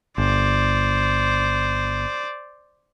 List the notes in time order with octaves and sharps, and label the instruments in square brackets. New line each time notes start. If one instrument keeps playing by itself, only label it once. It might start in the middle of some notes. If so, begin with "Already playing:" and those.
[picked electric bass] G1 [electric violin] C5 D5